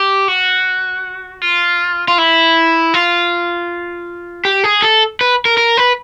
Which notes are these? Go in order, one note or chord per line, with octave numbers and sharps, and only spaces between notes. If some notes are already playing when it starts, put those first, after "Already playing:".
Already playing: G4
F#4
F4
F4
E4
F4
G4
G#4
A4
B4
A#4
A#4
B4